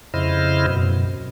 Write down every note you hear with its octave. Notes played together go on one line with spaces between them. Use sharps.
F2 C#3 E4 C5 D#5 F6
F#2 B2